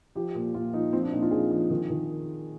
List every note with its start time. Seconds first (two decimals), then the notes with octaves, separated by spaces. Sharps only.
0.15 F3 G4
0.35 A#2
0.54 A#2 F4
0.74 F3 D#4
0.93 F3 C4
1.03 D4
1.12 A#2 D#4
1.22 F4
1.31 F3 G#4
1.51 F3
1.70 D#3
1.90 D#3